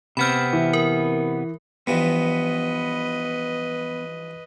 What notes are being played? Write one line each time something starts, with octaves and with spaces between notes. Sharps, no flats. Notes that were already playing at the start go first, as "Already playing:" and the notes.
C3 B3 C4 B5 F6
E3
A#4
G2 E3 F3 B3 B4 D#5